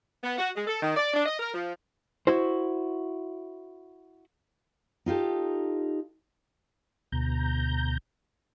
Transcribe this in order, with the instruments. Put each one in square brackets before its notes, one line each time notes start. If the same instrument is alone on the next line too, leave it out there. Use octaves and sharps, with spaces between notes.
[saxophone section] B3
F#4
G#3
A4
D#3
D5
D4
D#5
A#4
F3
[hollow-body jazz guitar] E4 F#4 C5
[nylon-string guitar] D#4 F4 G4 A4
[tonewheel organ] D2 B2 A#5 G6